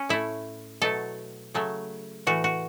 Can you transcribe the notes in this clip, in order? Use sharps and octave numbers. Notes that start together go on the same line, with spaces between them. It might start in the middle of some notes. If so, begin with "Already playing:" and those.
Already playing: C#4
A2 A3 E4
B2 F#3 A3 A4
C#3 F#3 A3
A2 E3 A3 F#4
F#4